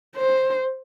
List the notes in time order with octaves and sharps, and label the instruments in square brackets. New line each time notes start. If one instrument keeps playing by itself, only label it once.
[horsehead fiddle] C5